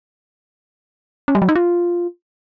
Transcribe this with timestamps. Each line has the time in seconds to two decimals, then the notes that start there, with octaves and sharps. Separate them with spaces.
1.28 C#4
1.35 G3
1.42 F#3
1.49 D#4
1.56 F4